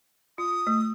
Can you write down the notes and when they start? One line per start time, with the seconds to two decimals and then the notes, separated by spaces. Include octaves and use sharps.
0.38 F4 D#6
0.67 A3